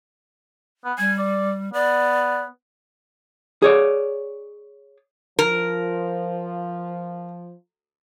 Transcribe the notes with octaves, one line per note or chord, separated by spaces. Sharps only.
B3
G3 G#5
D5
B3 D5
G#4 C#5 D5
F3 A#4